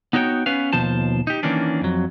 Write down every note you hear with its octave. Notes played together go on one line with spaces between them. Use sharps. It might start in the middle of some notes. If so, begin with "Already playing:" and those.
B3 D#4 F#4 C#5 D#5 G5
B3 C#4 B4 F5
D#2 B2 F3 C5 A5
D#4 G4
D#3 E3 A#3 C#4 D4
F2 F#3